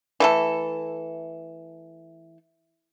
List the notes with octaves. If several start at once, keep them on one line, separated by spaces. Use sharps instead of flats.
E3 A3 A4